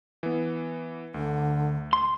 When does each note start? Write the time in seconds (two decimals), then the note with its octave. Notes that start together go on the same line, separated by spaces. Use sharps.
0.23 E3 B3
1.14 D2 D3
1.93 C6